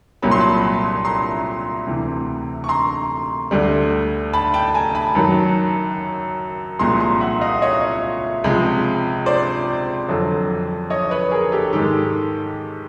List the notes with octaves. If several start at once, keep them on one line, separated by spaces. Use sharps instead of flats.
C2 A#2 F#3 B5
C6
A5 B5
A#5 C6
D2 C3 E3
C#6
A#5 C6
D2 D3 G3
A5 B5
G5 A5
G#5 A#5
A5 B5
F#2 D#3 F#3
C2 A#2 F3 G#3 A#5 C6
A#5 C6
E5 F#5
D#5 F5
C#5 D#5
C#2 C3 F3 G#3
C5 D5
F2 D3 F#3
C#5 D#5
B4 C#5
G#4 A#4
G4 A4
G#2 D#3 G#3 G4 A4